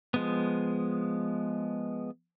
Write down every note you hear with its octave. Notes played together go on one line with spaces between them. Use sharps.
F3 G#3 B3